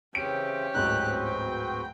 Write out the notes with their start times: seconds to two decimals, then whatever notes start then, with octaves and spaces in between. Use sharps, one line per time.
0.15 C#3 E3 C4 C#4 G4 D7
0.74 D1 G#2 C4 D#4 F#4 B4 F#6
1.25 G5